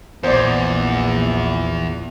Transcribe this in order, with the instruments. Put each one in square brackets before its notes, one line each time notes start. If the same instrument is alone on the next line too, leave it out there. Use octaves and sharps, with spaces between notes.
[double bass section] A#1 [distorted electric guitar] E2 [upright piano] C5 D5